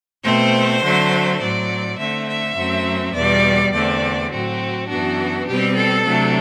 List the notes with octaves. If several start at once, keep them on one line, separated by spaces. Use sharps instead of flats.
B2 A3 C4 C5
D3 F#3 A3 C4
A2 F#3 C4 D5
D3 A3 C4 E5
E5
F#2 F#3 A3 C4
E2 B2 G3 D5
E2 D3 A3 C4 D5
A2 F#3 C4 F#4
F#2 E3 B3 D4 F#4
B2 G3 C4 G4
A4
C3 F#3 A3 D4